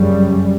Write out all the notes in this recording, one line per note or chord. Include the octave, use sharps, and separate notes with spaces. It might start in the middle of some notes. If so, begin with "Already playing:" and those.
Already playing: F#2 C#3 G3